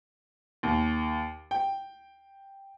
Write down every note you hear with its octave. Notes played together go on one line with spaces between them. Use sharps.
D#2
G5